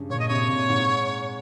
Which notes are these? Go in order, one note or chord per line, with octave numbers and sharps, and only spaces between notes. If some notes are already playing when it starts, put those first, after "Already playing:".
Already playing: G2 C#3
A#2 C#5
D#5
C3 C#5
A#2
G#2